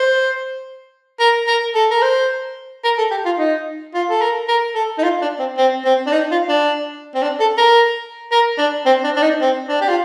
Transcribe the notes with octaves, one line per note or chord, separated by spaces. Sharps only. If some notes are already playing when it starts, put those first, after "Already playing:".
Already playing: C5
A#4
A#4
A4
A#4
C5
A#4
A4
G4
F4
D#4
F4
A4
A#4
A#4
A4
D#4
F4
D4
C4
C4
C4
D4
D#4
F4
D4
C4
D4
A4
A#4
A#4
D4
C4
D4
D4
D#4
C4
D4
G4
F4